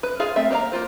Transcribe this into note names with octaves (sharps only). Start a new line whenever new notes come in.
B4
F4 G#4 F5 G#5
A3 C4 E5
A#3 C5 D#5 F5 A#5
A#3 C4 F4 C5